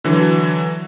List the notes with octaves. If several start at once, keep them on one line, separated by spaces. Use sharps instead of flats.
D3 E3 F#3